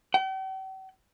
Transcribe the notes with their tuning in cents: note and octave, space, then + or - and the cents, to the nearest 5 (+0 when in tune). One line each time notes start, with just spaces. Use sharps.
G5 -45